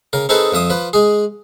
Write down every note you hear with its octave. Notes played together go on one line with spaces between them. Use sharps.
C#3 A#4
C4 D#4 G#4 A4 B4
F2 F3 E5 D#6
F3 B4
G#3 G#4